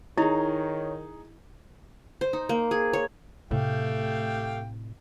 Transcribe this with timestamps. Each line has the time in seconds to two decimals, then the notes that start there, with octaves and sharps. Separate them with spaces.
0.18 D#3 D#4 E4 G#4 C#5 A#5
2.21 C5
2.33 D#4
2.49 A#3
2.71 G#4
2.93 C#5
3.51 A2 C3 A3 G4 F5 G5